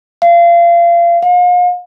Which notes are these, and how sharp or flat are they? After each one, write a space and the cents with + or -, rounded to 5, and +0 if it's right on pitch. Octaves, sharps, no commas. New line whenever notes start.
F5 -30
F5 +40